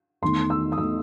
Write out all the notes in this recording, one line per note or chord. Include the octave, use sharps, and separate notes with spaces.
E2 D#3 A3 C6
E6
D#6
E2 D#3 A3 E6